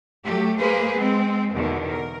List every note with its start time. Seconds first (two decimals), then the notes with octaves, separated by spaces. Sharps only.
0.25 F#3 A3 G4
0.58 G#3 A#3 G#4 B4 C5
0.98 G#3 C4
1.53 E2 B2 D3 D#3
1.89 A#4